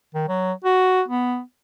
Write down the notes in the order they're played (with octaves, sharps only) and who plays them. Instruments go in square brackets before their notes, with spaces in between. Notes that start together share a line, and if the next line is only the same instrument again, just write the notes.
[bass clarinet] D#3
F#3
F#4
B3